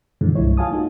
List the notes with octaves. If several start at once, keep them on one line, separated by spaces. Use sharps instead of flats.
F#2 A#2 D3 E3 F3 G#3
C2 G2 G#3 E4 C#5
F4 F5 G#5 A5 D#6
A#3 D#4 F#4